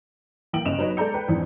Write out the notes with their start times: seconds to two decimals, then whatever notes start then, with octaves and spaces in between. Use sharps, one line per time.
0.53 E3 A#3 G5 D7 F#7
0.65 G1 C#3 D#5 E7 F7
0.79 F#3 D#4 B4 C#5 D#5
0.97 G#3 A4 D5 A#5 G6 C#7
1.14 B4 G5
1.28 F2 G#2 E3 D4